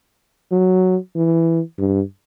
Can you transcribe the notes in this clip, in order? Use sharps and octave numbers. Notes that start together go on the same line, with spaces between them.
F#3
E3
G2